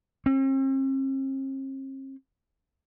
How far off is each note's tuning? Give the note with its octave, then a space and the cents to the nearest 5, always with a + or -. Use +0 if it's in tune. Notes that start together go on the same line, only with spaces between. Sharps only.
C4 +45